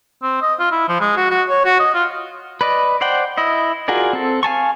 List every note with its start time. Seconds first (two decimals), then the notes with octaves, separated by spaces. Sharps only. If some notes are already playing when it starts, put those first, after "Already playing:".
0.22 C4
0.42 D#5
0.60 F4
0.71 E4
0.88 F3
1.00 G#3
1.17 F#4
1.30 F#4
1.49 C#5
1.65 F#4
1.80 D#5
1.94 F4
2.61 B4 D5 D#5
3.01 C5 D5 F#5 G5
3.37 E4 D#5
3.88 F4 F#4 G#4 A#4 D5
4.13 C4 A4
4.43 F5 G#5 A5 C#6